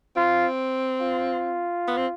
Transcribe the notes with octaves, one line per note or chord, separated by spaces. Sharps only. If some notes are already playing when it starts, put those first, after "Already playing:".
C4 F4
F4
B3
C4